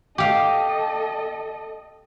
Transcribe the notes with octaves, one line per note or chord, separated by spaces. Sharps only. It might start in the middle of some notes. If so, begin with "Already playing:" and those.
G4 A4 D#5 F5